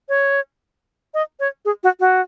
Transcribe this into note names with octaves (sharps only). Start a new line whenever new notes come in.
C#5
D#5
C#5
G#4
F#4
F#4